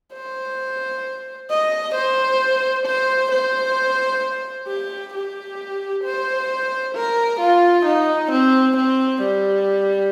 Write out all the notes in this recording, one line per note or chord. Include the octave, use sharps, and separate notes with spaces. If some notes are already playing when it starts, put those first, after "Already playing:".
C5
D#5
C5
C5
C5
G4
G4
C5
A#4
F4
D#4
C4
C4
G3